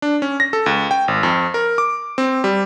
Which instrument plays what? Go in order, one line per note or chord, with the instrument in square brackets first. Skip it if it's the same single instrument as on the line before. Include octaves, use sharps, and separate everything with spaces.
[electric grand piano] D4
C#4
A#6
A4
C#2
G5
G#1
F2
A#4
D6
C4
G3